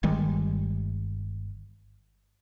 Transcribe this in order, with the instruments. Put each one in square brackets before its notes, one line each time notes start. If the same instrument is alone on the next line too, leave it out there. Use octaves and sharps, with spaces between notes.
[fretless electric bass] G1 D#3 G3 G#3